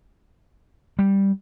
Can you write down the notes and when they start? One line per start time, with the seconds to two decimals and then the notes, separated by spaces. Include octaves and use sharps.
0.99 G3